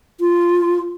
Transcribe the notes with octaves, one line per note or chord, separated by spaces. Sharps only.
F4